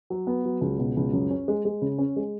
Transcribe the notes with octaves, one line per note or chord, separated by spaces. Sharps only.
F#3
B3
F#3
C#2
B2
C#2
F#2
C#4
G#3
G#3
C#3
C#4
G#3